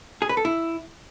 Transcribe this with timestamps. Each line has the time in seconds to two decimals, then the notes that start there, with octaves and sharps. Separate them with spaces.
0.22 G#4
0.29 B4
0.37 A4
0.45 E4